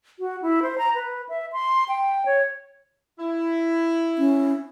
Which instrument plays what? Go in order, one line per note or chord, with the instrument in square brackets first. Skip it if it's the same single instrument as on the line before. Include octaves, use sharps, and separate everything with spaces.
[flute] F#4
E4
C5
A#5
B4
E5
C6
G5
C#5
[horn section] E4
[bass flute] C#4